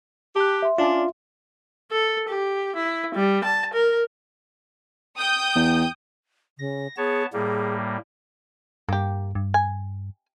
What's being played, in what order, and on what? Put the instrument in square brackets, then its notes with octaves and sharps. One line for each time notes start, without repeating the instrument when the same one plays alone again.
[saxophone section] G4 [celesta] A5 F#6
[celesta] E5 C6
[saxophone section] C#4 D4 [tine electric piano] F4
[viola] A4
G4
E4
G3
A5
A#4
[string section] G5 D#6 G6
[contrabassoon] E2
[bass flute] C#3 [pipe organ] A#6
[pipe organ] B3 C#5 A5 [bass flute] G#4
[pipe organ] A2 G3 A#3 [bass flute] G#4
[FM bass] G2 [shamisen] A#3 G4
[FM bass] G2
[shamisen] G#5